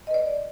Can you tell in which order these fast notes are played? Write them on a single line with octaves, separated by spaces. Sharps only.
D#5 B4 D5